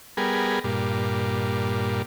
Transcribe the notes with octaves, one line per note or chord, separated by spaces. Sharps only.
G3 B3 G#4 A#4
G2 A#2